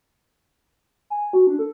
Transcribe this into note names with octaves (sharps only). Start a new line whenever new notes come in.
G#5
F#4
D4
A4